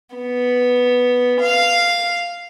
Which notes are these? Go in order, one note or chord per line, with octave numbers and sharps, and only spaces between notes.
B3
F5